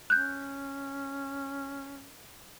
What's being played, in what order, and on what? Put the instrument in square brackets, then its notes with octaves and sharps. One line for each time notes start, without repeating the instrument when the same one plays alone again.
[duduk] C#4 [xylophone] F#6 G6